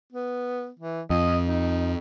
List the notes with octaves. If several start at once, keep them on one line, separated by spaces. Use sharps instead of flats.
B3
E3
F2 D#5
D#4